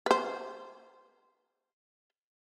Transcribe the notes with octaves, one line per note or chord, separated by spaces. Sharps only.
B4 C5